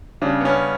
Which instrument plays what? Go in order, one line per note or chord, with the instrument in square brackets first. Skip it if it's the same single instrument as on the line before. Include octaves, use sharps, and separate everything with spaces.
[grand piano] C#3 G3 D4
B3
C#4